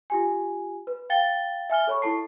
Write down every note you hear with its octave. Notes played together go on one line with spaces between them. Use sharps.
F4 G4 G#5
B4
F5 G5 A6 G7
E5 G#5 F6 G7
A4 C#5 B5 C#6
E4 A4 A5 C7